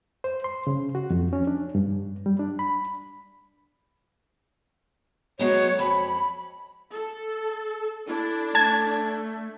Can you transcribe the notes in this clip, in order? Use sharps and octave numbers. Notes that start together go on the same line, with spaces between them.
C5
C6
C#3
F#4
F2
C#4
D4
G2
G3
D4
B5
F#3 G#3 B3 C#5
F2 B5
A4
D4 E4 A4
A3 A5 G#6